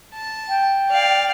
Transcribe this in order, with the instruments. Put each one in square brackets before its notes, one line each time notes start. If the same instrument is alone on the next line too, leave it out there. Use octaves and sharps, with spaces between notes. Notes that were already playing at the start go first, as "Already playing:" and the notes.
[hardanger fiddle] A5
[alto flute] G5
[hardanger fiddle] D5 F5